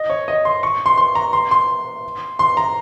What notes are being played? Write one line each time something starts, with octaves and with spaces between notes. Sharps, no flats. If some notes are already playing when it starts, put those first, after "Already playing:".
Already playing: D#5
C#5
D#5
C6
C#6
C6
C6
A#5
C6
C6
C6
A#5